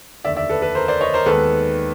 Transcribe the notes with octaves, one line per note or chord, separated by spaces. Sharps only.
F1 D#2 D3 D5 E5
D5 E5
A4 B4
A4 B4
A#4 C5
C5 D5
C#5 D#5
A#4 C5
D#2 D#3 G#3 B3 A4 B4